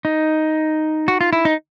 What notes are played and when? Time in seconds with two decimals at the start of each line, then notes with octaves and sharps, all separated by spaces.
0.05 D#4
1.08 F#4
1.21 F4
1.33 E4
1.45 D#4